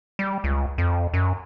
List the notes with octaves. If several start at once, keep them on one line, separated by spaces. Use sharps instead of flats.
G3
C#2
F2
F#2